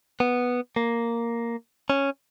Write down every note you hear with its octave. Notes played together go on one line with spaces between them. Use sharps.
B3
A#3
C#4